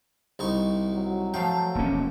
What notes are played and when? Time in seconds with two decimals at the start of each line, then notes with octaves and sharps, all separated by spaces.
0.39 C2 D#4 C#6
0.94 F#3
1.34 F3 A3 F5 G5
1.75 E1 A#3 C#4